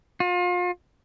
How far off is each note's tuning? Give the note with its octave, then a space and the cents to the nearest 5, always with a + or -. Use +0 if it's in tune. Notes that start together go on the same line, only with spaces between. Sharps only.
F4 +35